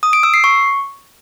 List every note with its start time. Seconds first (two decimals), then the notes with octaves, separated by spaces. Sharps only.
0.03 D#6
0.13 D7
0.23 E6
0.34 C7
0.44 C#6